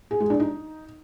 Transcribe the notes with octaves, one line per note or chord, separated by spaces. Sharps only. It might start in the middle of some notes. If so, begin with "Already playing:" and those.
G#4
G#3
D4
D#4